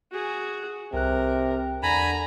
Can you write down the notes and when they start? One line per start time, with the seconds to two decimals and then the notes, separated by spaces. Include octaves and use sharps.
0.12 F#4 G#4
0.93 C2 C3 A#4 F#6
1.83 E2 D3 G#5 A#5 B5